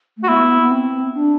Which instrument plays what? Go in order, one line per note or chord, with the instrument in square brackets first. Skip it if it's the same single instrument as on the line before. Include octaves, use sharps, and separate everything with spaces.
[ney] A3
[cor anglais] F#4
[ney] B3 [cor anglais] E4
[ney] B3
C4
D4